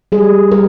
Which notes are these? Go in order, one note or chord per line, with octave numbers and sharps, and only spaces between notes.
G3 G#4
G3 A#4